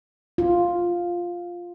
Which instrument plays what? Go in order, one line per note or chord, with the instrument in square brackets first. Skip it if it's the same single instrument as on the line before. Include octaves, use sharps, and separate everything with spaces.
[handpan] F4